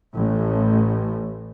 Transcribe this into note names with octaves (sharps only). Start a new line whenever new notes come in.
A1 A2